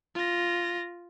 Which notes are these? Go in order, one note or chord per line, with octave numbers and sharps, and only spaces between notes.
F4 A#6